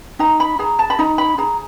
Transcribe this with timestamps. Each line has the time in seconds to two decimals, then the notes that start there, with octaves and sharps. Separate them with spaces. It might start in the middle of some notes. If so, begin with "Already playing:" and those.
0.19 D#4 A#5
0.40 B5
0.59 G#4 A#5
0.79 A5
0.90 B5
0.99 D#4 A#5
1.18 B5
1.38 G#4 A#5